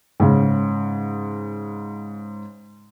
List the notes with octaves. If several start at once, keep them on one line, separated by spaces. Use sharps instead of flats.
G#2 C#3